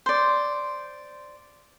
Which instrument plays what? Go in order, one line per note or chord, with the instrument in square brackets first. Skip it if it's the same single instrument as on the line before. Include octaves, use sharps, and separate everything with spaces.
[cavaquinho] C5 D5